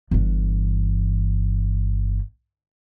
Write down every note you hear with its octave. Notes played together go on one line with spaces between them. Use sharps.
G1 E3